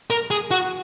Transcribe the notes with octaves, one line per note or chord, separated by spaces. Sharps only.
A#4
G#4
F#4